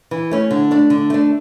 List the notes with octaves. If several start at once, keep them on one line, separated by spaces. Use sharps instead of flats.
E3
A3 C#4
D3
A3 D4
D3
A3 D4